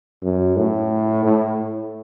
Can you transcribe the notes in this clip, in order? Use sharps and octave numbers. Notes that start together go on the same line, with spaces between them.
F#2
A2
A2